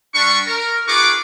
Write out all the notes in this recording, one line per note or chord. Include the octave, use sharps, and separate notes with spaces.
G3 D4 C#6
A#4
D#4 F4 G#4 B4 C#6 D6